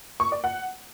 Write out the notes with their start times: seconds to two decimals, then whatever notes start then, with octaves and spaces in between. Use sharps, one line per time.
0.20 C#6
0.32 D5
0.44 F#5